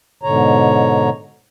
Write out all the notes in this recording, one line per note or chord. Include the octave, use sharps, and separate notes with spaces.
G#2 B2 D3 C#5 A#5